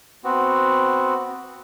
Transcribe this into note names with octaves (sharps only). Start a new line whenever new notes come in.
B3 C4 F#4